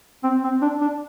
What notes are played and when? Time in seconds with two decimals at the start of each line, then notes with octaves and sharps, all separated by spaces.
0.24 C4
0.44 C4
0.62 D4
0.81 D4